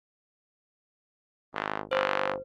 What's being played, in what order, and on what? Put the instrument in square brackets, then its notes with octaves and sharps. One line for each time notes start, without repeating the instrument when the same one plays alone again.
[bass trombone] G#1
[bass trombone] G1 [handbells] C5